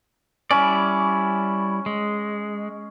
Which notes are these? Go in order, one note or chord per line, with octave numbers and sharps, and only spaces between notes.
G3 C#4 E4 D5
G#3